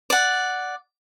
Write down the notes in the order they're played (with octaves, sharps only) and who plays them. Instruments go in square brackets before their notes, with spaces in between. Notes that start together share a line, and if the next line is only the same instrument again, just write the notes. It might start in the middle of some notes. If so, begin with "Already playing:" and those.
[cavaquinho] D5 F#5